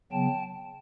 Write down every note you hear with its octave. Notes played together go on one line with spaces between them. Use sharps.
C#3 F#3 B3 G5 A5